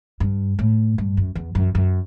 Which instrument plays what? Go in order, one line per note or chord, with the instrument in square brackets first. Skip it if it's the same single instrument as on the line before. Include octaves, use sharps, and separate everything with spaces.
[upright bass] G2
A2
G2
F#2
E2
F#2
F#2